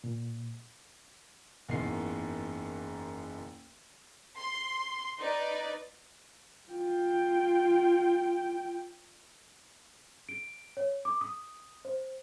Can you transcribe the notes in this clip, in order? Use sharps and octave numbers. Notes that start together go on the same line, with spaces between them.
A#2
F#1 E2 G#2 D#3 C7
C6
D#4 B4 D5
F4 G5
D7
C#5
D6
D#6
C5